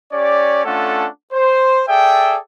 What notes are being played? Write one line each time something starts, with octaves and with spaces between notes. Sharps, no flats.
C#4 G4 C#5 D5
A3 C#4 D4 F4 A4 F#5
C5
G#4 A4 D5 E5 G5